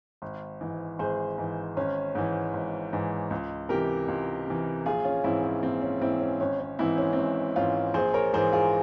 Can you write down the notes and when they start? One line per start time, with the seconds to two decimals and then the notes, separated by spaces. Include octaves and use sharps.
0.22 G#1
0.61 G#2 E3
0.99 G#1 G#4 C5
1.38 G#2 E3
1.77 G#1 C#4
2.15 G#2 E3
2.54 G#1
2.93 G#2 E3
3.31 C#2
3.69 C3 E3 G4 A#4
4.08 C#2
4.47 C3 E3
4.86 A#1 F4 G#4
5.04 C#4 F4
5.24 G#2 E3 C4 E4
5.44 C#4
5.63 A#1 C4
5.82 C#4
6.01 G#2 E3 C4 E4
6.21 C#4
6.40 G#1 C#4
6.60 C#4
6.79 G#2 E3 C4 E4
6.98 C#4
7.13 C4
7.17 G#1 C#4
7.56 G#2 E3 C#4 F4
7.94 A#1 G#4 C5
8.14 A#4 C#5
8.33 G#2 E3 G#4 C5
8.53 F4 G#4